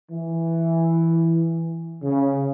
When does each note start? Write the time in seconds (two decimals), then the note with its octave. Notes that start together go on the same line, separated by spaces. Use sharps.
0.11 E3
2.04 C#3